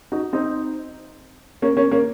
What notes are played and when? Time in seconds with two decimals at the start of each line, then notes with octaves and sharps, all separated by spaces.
0.12 D#4 F#4
0.33 C4 D#4
1.62 A#3 C#4
1.77 A#3 C#4
1.91 A#3 C#4